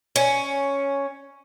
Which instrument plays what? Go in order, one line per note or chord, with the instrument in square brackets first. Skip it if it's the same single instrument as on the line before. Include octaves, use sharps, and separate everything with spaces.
[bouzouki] C#4